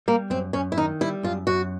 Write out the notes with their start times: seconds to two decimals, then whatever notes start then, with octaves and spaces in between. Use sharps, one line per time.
0.08 G3 A#3
0.30 F#2 C4
0.53 F#2 C#4
0.72 E4
0.77 D#3 D#4
1.01 G3 E4
1.23 F#2 F4
1.47 F#2 F#4